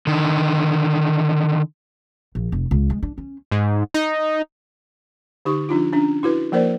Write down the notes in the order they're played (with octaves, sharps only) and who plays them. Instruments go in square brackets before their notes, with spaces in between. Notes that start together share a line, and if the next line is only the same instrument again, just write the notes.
[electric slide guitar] D3 D#3
[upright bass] A#1
F1
C#2
G#3
D4
C#4
[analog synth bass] G#2
D#4
[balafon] D3 D#4 G4 C#6
F3 D4 D#4 F4
C#4 D4
E4 F#4 B4
F3 A#3 A#4 C5 D5